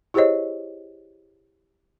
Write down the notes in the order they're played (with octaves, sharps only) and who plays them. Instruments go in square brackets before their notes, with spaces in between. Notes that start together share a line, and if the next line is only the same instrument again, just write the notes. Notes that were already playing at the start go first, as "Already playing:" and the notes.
[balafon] E4 G4 G#4 C5 C#5 D#5